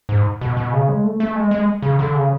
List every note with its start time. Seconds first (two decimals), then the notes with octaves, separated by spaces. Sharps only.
0.09 G#2
0.41 B2
0.57 B2
0.73 C#3
0.88 G#3
1.04 A3
1.20 A3
1.36 G#3
1.51 G#3
1.82 C#3
1.99 D3
2.15 C#3